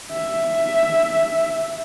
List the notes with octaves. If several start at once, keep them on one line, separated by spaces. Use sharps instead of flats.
E5